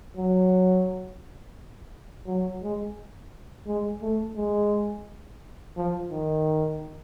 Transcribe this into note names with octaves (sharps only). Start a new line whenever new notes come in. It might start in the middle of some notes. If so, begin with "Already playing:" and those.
F#3
F#3
G#3
G#3
A3
G#3
F3
D#3